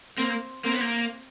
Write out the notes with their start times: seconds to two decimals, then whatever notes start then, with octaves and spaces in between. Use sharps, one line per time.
0.17 A#3 C4
0.65 A#3 C4
0.73 B3
0.81 A#3